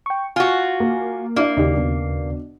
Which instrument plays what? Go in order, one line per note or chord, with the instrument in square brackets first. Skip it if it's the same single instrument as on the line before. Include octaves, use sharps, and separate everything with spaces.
[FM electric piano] G5 C#6
[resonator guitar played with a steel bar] F4 F#4 [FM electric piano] G#5
[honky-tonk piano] A#3
[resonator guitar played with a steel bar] A#3 [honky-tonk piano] D4 E4
[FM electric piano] D#2 C#3 D5 [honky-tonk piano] D#4 G4
[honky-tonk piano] B2 D4